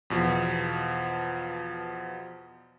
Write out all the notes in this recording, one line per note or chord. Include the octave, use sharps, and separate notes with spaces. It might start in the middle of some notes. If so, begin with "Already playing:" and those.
E2 B2 F3